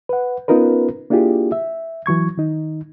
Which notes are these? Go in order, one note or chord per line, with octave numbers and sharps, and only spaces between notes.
B4 F#5
B3 C#4 D#4 F4 A#4 B4
A#3 D4 E4 F4 G4 G#4
E5
E3 F#3 C#6 G#6
D#3 D#4